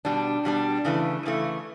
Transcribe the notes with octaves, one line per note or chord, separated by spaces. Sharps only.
B2 G3 D4
B2 G3 D4
C#3 E3 A3
C#3 E3 A3